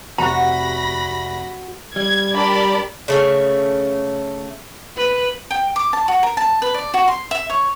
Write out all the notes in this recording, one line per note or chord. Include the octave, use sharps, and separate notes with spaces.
F1 C3 F#4 F#5 A#5 B5 A#6
G3 G#6
D4 G4 A#4 D5 B5
C#3 A3 E5
B4
G5
D6
A5
F#4
A#4
A5
B4
D5
F#4
C6
E5
C#5